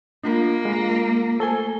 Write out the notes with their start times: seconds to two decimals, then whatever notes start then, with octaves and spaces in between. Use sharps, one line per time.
0.23 A#3 D4 F4 A#4
0.65 G#3 F4 A#4
1.40 A3 A4 C5 G#5 G7